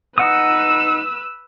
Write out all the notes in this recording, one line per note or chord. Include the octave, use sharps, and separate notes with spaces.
D#4 B4 F#5 D#6 E6